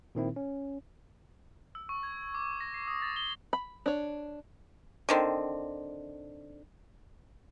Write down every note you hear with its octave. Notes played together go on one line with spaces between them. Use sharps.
A#2 D#3 C4 E4
C#4
E6
C#6
G#6
D6
A#6
C7
D#6
A6
G7
B5
D4 C#5
D3 D#3 C4